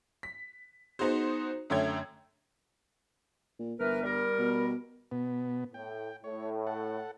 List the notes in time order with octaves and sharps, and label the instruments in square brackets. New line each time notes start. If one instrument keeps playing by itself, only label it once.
[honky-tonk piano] B6
B3 D#4 F#4 G#4 C5
F#2 D3 A3 C#5 G5 G#6
[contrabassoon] A#2
[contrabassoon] G1 [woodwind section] E3 A#4 B4
[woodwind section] G3 A#4
[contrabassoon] B2
[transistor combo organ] B2 B3
[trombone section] A2 [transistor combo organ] G5
[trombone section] A2 [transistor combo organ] C#5
[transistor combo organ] A4 F#5